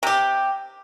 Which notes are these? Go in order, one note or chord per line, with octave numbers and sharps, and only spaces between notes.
C3 G4